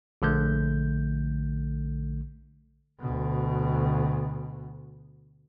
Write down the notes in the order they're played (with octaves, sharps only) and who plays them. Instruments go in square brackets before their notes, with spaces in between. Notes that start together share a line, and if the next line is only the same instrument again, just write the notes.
[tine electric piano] A#1 D3 A3 G6
[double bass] D2 B2